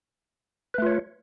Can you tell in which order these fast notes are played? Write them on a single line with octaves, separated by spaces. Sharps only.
B4 A3 F4 C#5